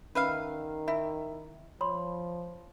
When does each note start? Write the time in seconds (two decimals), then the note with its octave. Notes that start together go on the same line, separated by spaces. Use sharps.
0.15 D#3 C#4 B4 E5 F5 B5
0.88 E4 E5
1.81 F3 C#5 B5 C6